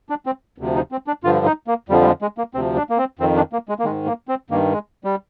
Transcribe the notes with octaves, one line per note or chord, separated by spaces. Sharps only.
D4
C4
D2 C3 F3
D#4
C4
D4
G2 D3 F3 F4
D#4
A#3
F2 D3 F3 G3
G3
G#3
G#3
A#3
D2 C3 F3 C4
D4
A#3
C4
F2 D#3 C4
D4
A#3
G#3
A#3
G#2 D#3 G#3
A#3
C4
G2 D#3 A#3
G#3
G3